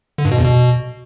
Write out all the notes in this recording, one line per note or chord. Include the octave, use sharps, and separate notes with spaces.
D3
G2
B2
E2
B2